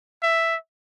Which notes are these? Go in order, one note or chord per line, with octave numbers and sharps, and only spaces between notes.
E5